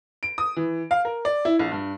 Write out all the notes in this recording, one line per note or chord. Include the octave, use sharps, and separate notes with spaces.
D7
D#6
E3
F5
A#4
D5
E4
A#1
G2